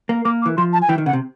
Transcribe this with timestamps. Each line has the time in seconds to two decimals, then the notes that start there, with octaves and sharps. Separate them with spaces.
0.09 A#3
0.25 A#3 D6
0.42 D6
0.46 E3
0.57 F3 C6
0.73 A5
0.82 G#5
0.89 E3 G5
0.98 D#3
1.06 C#3 F#5
1.13 C3